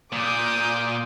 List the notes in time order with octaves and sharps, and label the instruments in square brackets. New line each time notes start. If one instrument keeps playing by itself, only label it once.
[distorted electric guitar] A#2 [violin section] D6 D#6 G6